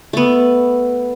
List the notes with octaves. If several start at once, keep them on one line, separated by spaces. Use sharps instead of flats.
A3 B3